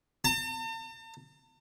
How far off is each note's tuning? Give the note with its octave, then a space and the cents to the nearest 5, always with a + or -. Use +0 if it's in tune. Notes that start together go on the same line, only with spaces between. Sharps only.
A5 +45